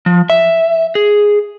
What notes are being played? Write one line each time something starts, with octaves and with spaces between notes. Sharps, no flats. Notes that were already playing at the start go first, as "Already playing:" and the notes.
F3
E5
G#4